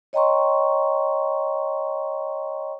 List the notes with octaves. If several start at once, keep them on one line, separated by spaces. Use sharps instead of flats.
C#5 D#5 G5 A#5 C6 C#6